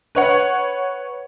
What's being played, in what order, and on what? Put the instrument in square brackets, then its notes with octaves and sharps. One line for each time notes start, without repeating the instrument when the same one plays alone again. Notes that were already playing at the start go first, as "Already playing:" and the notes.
[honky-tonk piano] B4 C#5 F#5